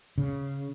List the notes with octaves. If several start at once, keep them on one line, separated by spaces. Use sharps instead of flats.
C#3